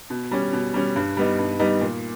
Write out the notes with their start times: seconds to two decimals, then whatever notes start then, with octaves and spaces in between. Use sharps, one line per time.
0.10 B2
0.31 G3 C#4
0.53 B2
0.74 G3 C#4
0.96 G2
1.17 G3 B3 D#4
1.39 G2
1.60 G3 B3 D#4
1.81 A#2